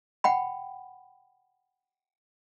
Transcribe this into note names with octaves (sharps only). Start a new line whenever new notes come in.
F#5 G5 B5